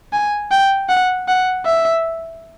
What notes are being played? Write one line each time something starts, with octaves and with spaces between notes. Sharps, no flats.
G#5
G5
F#5
F#5
E5